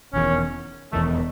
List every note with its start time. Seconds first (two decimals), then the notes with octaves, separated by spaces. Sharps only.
0.13 E1 E2 D#3 C#4
0.92 E1 E2 D#3 A3